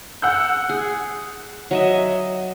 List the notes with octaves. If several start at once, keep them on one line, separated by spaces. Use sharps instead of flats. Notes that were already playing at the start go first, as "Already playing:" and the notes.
F#5 E6 G6
G#4
F#3 D#5 E5